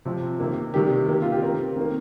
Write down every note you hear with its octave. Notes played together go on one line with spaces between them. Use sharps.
C3 F3 C4
C3 D#3 A#3
C3 D#3 G3 A#3 G4
D#3 A#3
F4
G4
D#3 C4 A#4
D#3 A#3